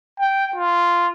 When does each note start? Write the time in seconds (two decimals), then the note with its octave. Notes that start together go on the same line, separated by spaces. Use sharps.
0.20 G5
0.56 F4